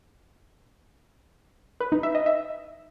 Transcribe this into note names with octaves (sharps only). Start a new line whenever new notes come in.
B4
D#4
E5
D#5
E5